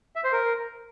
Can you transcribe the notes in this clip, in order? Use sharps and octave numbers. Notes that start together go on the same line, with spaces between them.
E5
C5
A#4